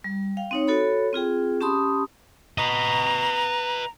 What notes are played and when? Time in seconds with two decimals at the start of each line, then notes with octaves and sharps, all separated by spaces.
0.04 G3
0.37 F5 G5
0.51 C4 D#4 C#5
0.67 F#4 A4 C#5 B5
1.13 C4 F4 G#4 G5
1.61 C#4 G4 A5 B5 C6 D#6
2.58 B4 D#5 A#5